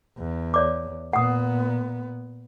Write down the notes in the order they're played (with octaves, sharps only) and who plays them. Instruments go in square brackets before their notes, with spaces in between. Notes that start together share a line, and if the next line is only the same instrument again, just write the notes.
[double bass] E2
[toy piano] C#5 D5 D6
[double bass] A#2 B3 [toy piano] F#5 D#6